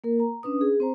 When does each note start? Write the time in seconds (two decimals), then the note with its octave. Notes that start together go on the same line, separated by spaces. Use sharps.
0.04 A#3 A#4
0.20 A#5
0.43 C#4 D4 B4 D#6
0.61 G#4
0.80 C4 C5 A#5